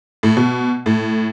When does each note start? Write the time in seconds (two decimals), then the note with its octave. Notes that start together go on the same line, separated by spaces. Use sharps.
0.23 A2
0.37 B2
0.86 A2